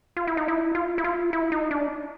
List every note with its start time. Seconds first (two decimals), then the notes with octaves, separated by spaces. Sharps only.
0.17 F4
0.27 E4
0.37 D#4
0.48 E4
0.75 F4
0.98 E4
1.04 F4
1.33 E4
1.52 D#4
1.71 D4